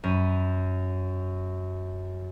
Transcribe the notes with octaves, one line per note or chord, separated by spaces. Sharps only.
F#2 C#4 B5 D#7